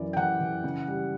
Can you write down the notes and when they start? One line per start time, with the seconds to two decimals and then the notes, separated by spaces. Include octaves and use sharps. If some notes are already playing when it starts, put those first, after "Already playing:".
Already playing: F#2 E3 D5
0.13 G5
0.17 E3 F#5
0.41 E3
0.64 C#3
0.88 G3